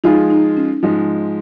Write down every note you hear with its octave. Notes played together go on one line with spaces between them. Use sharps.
F3 G#3 D#4 F4 G#4
D#4
C#4
G#2 F3 G#3